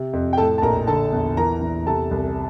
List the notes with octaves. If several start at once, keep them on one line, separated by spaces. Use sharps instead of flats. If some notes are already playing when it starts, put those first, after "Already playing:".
Already playing: C3
F2
G5
A2 A4 A5
A5
A#1 A#4 A#5
D3 A4 A5
E2
E3 A#4 A#5
E2
C3 A4 A5
C2